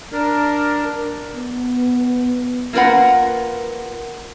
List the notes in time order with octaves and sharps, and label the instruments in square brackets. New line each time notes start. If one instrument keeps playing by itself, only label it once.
[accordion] D4 A#4
[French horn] B3
[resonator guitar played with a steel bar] A#3 F4 A#4 B4 F#5